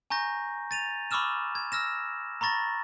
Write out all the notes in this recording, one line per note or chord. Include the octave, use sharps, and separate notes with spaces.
G#5 A#5 C#6 G6 A#6
A6 D#7 F7
B5 C#6 D6 E6 F6 E7
G#6
E6 F6 A#6 E7
A#5 B5 C#6 A6 A#6